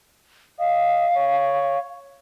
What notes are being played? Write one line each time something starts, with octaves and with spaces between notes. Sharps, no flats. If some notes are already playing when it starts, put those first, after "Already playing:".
D#5 F5
C#5